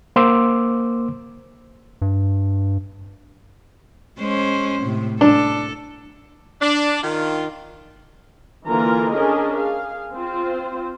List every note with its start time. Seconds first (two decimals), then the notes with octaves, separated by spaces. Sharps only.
0.16 A#3 C5 C6 D6 E6
2.02 G2
4.18 G#3 C#4 C5
4.83 A2 C3
5.21 D4 A4
6.62 D4
7.02 D#3 F4
8.68 D3 E3 A#3 F4 A#4 A#5
9.14 C#4 D4 G#4 A#4 D#5
9.57 G#4 F5
10.14 C4 F4 C5